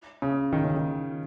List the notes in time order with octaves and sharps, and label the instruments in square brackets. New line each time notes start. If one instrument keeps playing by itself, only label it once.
[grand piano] C#3
D#3
C#3
D#3